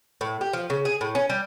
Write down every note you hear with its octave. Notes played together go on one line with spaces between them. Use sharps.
A2
G4
F3
C#3
G#4
A2
C#4
G3